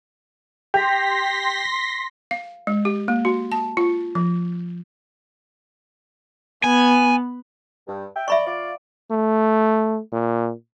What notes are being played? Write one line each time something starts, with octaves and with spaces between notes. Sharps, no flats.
G4 C6 A#6 B6
F5
G#3
G4
A#3
F#4
A5
F4
F3
B3 G#5
G2
E5 G5
D5 E5 B5 C#6
F4 D5
A3
A#2